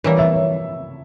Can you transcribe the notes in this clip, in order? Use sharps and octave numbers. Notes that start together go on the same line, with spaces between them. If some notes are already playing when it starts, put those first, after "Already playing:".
E3 G3 A#3 C#5
E5
C#5